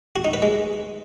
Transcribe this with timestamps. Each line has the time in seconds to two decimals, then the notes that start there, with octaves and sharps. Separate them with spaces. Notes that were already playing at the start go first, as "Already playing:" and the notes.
0.16 F#4
0.25 D#4
0.33 B4
0.42 G#3